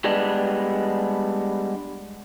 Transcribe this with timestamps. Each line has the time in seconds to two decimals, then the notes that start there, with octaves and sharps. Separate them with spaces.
0.04 G3 G#3 B3 D4